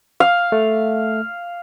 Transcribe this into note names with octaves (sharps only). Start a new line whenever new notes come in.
F5
A3